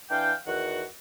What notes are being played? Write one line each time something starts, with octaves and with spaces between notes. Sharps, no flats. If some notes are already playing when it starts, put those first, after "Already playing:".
E3 D4 F5 G5
E2 D#3 F#4 F#5